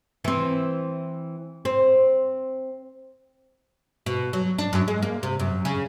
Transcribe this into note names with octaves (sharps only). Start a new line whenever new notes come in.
E3 C4
C4
B2
F#3
D4
F#2
G#3
A#3
C3
F#2
C#3